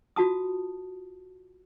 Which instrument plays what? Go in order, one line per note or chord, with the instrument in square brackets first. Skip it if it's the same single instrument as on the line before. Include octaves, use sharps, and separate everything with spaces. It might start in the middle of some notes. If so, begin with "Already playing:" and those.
[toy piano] F4 F#4 A5 D#6